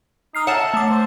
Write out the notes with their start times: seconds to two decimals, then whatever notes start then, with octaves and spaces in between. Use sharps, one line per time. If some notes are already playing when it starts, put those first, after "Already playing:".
0.35 D#4 D#6 F6 C7
0.47 C#5 E5 F#5 A5 A#5
0.74 A3 D6
0.90 C5